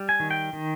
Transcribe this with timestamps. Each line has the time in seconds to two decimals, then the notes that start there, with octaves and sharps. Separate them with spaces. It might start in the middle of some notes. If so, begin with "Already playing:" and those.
Already playing: G3
0.09 G#5
0.20 D#3
0.31 G5
0.53 D#3